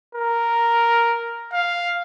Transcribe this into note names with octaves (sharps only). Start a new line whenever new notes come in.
A#4
F5